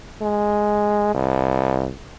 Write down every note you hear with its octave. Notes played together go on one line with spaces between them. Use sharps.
G#3
C2